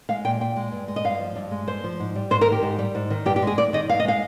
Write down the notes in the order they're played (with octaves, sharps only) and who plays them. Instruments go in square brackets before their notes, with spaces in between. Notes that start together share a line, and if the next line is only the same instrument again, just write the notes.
[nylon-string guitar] G#3 F5
A#2 G5
A#2 G5
G#3
G2
G#3
D#5
G2 F5
F3
G2
G#3
G2 C5
F3
G#2
G3
G#2 C5
A#4
D#3
G4
G#2
G3
G#2
D#3
G2 G4
G4
G#3
G#4
G2 D5
D#3 D#5
G2 F5
D#5
G#3 F5